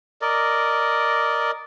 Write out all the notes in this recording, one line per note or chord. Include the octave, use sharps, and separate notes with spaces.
A#4 D5 D#5